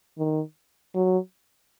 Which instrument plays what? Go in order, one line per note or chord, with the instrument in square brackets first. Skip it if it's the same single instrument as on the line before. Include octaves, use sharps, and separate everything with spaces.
[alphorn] D#3
F#3